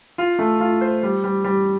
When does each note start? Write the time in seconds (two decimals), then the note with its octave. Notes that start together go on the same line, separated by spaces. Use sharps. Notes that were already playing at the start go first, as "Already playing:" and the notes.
0.18 F4
0.39 A3
0.60 F4
0.81 C5
1.03 G3
1.24 G3
1.44 G3